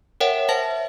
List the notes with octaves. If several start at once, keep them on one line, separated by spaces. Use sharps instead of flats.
A#4 C#5 E5 F#5 G5
C5 E5 A5 A#6